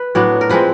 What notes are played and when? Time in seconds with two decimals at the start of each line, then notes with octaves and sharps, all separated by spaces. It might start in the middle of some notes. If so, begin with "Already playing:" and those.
Already playing: B4
0.15 A2 F#3 B3 D4
0.41 A#4
0.49 F3 G#3 C4 B4